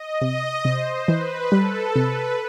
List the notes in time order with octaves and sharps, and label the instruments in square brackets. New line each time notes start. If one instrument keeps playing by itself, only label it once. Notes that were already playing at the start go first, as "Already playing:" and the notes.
Already playing: [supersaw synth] D#5
[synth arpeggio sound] C3
[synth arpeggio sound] C3 [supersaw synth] C5
[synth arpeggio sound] E3 [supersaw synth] B4
[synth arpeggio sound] G3 [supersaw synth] A4
[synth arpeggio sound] C3 [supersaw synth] B4